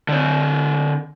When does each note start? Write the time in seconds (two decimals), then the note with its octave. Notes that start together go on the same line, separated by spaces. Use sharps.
0.09 D3 C#5